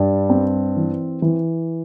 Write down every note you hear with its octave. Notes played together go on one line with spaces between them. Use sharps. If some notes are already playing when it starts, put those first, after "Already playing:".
Already playing: G2 G3
C4
E3
E3